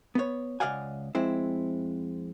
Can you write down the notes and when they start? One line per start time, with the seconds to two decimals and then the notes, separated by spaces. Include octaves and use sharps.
0.15 B3 C#5
0.60 C#2 D5 D#5 F5 F#5 G#5
1.15 F2 G#3 C4 E4